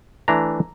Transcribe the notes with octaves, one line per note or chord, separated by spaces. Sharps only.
E3 A3 D4 A#5